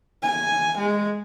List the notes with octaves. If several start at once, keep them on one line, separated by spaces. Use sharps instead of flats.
G#5
G#3